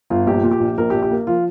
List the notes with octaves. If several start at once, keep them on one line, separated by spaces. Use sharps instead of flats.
G1 F4
A#1 G4
A#2
G4
A#1
A#1 A#4
A#1 G4
G4
A#3
F3 F4